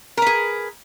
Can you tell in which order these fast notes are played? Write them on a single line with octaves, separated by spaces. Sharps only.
A#4 B4 G#4